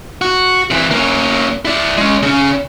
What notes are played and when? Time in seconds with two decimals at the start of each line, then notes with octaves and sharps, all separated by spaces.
0.21 F#4
0.70 C3 E3
0.91 A#3 C#4
1.65 E4 D5
1.98 G#3 C#4
2.23 C#3 C#4